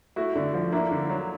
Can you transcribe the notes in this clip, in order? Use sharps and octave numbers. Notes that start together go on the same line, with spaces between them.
A3 E4 F#4
D3
F3
A#3 D4 E4
D3
F#3